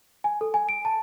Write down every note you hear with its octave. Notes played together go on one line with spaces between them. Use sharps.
G#5
A4
G#5
D7
A5